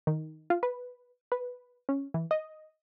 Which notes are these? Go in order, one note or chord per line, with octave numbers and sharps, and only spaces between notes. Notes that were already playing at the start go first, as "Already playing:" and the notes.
D#3
F4
B4
B4
C#4
E3
D#5